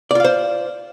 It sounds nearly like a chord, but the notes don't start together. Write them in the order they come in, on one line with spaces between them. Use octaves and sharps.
D5 F4 F5 C5